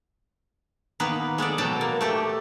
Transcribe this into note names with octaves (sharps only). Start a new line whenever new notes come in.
D#3 A#3 B3 B4
G#3 B3 A4 D5
B2 F#3 F#5 G5 A5
A#3
A3 G4 A4